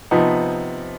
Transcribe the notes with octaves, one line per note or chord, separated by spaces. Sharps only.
C3 F3 B3 D#4